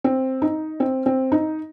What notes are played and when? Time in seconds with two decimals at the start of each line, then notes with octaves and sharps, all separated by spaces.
0.04 C4
0.42 D#4
0.80 C4
1.06 C4
1.32 D#4